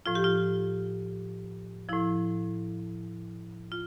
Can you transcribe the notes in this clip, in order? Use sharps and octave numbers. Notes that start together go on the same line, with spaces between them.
A2 F3 F4
G4
F4
A2 F3 E4
F4